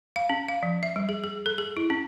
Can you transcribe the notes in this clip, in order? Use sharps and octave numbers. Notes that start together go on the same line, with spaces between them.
F5
C#4
F5
F3
E5
G3
G#4
G#4
A4
G#4
E4
C#4